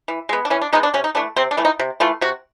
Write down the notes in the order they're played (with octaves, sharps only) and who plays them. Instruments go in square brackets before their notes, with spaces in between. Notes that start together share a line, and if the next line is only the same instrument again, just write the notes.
[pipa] E3
G#3 B3
D4
E3 C#4
D4
G#3 B3 D#4
D4
C3 C#4
D#4
E3 A3 D4
C3 C4
D4
E3 A3
D#4
C3
E3 A3 F4
C3 F#4